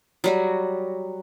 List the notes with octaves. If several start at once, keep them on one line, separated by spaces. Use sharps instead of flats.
F#3 G3 F#4